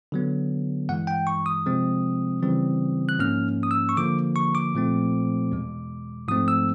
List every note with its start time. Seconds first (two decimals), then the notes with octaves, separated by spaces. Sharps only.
0.12 D3 F#3 B3
0.89 G2 E3 G#3 F#5
1.07 G5
1.27 C#6
1.46 D#6
1.66 C3 F3 G#3 C4
2.43 C#3 E3 G3 C4
3.09 F#6
3.19 G#2 F3 A#3 C#4 F6
3.63 D#6
3.71 E6
3.89 C#6
3.97 D3 F3 A#3 D6
4.36 C#6
4.55 D6
4.75 A#2 F3 A3 C4
5.52 E2 B2 G#3
6.28 G#2 F3 A3 C4 D#6
6.48 E6